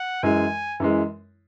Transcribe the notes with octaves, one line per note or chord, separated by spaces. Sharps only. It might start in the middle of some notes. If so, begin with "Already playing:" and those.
Already playing: F#5
F#2 E3 G#3 G#5
F#2 E3 G#3